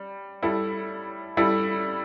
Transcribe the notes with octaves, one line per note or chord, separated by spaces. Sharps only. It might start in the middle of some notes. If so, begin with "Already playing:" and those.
Already playing: G3
G3 E4 A4
G3 E4 A4